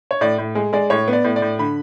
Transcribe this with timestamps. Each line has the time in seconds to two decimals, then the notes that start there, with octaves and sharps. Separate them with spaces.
0.11 C#5
0.21 A2 D5
0.38 A2
0.55 G#3
0.73 G#3 D5
0.90 A2 C#5
1.08 B3
1.13 D5
1.24 A2
1.36 D5
1.42 A2
1.59 D3 B5